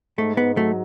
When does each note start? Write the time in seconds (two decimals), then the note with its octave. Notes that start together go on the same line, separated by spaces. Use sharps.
0.18 G#2 A3
0.37 G#2 B3
0.57 F#3 A3